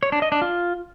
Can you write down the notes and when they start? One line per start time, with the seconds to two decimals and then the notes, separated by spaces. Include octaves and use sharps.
0.03 C#5
0.12 D4
0.22 D#5
0.32 D4
0.42 F4